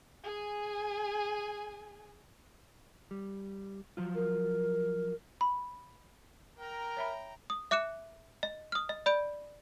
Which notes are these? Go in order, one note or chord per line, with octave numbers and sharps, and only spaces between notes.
G#4 G#5
G3
F3 F#3 F4
A#4
B5
A#4 G5 A#5
C#5 E5 B5
D#6
E5 D6 F#6 C#7 E7
D#5
D#6 F6
D#5
D5 B5 G6 D7